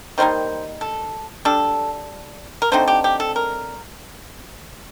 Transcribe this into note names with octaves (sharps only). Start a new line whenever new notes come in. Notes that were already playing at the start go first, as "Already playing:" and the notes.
D#3 G3 A#3 D#4 C5
A4
G3 D4 A4
A#4
D3 A3 C4 D#4 C5
G4
G4
A4
A#4